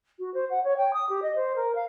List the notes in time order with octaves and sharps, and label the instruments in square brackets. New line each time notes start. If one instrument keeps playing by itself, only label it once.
[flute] F#4
C5
F#5
C#5
G5
D#6
G4
D#5
C5
A#4
F5